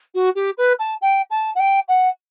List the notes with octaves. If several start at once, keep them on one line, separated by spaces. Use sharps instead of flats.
F#4
G4
B4
A5
G5
A5
F#5
G5
F#5